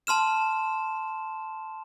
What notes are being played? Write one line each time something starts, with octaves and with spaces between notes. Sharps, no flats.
A5 C6 F6 E7